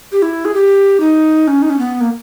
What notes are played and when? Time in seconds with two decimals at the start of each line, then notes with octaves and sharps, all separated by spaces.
0.12 G4
0.22 E4
0.45 G#4
0.54 G4
1.00 D#4
1.47 C#4
1.62 D#4
1.70 C#4
1.79 B3
2.01 A#3